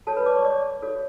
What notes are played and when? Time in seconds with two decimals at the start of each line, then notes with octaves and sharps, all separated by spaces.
0.07 F#4 A4 C#5 A5
0.17 B4 B5
0.26 D5 D6
0.36 C#5 C#6
0.45 D5 D6
0.82 F#4 A4 C#5